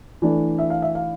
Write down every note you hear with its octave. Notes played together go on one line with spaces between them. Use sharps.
E3 A3 D4
E5
F5
E5
F5